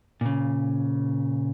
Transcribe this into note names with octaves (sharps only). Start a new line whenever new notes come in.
A#2 C#3